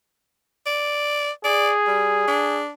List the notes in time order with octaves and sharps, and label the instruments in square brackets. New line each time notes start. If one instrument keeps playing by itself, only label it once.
[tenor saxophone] D5
[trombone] G#4 [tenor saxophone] D5
[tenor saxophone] G3
D4